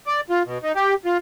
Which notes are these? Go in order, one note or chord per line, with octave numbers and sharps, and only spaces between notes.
D5
F4
B2
D#4
G4
F4